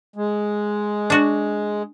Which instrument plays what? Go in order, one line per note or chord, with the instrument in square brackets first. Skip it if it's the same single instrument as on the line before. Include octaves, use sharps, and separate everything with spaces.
[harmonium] G#3
[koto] D4 F#4